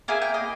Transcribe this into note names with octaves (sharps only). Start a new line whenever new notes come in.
A#3 E4 G#4 G#5
G5
D#5